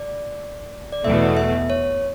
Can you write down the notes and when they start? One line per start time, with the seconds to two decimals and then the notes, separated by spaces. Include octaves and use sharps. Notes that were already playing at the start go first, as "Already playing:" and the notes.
Already playing: D5
0.93 D5
1.04 E2 B2 A3 E5
1.37 E5
1.70 C#5